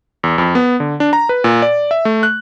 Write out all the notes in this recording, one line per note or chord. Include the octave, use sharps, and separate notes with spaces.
E2
F2
B3
D3
D4
A#5
B4
A#2
D5
E5
A3
F#6